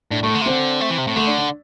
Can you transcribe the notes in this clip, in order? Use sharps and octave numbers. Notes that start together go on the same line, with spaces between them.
A2 D4
A2 A3
D3
C3
D3 C4
A3
E3
C3
A2
D3 A3
D4
D4